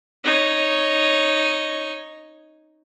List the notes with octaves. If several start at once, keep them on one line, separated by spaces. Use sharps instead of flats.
D#4 C#5